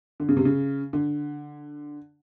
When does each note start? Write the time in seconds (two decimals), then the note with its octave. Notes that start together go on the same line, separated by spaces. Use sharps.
0.20 D3
0.29 C#3
0.37 C3
0.45 C#3
0.93 D3